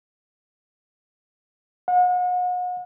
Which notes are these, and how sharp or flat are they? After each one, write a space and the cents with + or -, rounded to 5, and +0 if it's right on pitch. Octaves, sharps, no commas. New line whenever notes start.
F#5 -40